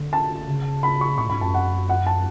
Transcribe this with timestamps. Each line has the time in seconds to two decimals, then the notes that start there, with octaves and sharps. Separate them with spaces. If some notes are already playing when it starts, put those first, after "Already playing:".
Already playing: D3
0.13 A5
0.47 C#3
0.83 B5
1.01 C#6
1.18 A2 C#6
1.30 G#2 B5
1.41 F#2 A5
1.54 F#5
1.89 F#5
2.06 A5